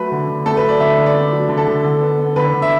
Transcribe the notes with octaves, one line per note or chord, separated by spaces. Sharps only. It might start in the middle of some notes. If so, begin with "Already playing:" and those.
Already playing: F#3 A3 B4
D3
D3
A3 A4
B4
F#3
D5
D3 E5
D3
D5
A3
F#3
D3
A4
D3
D3
B3
B3
D3 B4
D3
E5